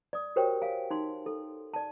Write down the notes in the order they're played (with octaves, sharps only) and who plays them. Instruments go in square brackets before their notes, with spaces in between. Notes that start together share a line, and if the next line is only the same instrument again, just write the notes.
[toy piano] D5 D#6
F#4 G4 A#4 C5 C#5 G5
F5 G#5
D#4 C6
A4
D5 A5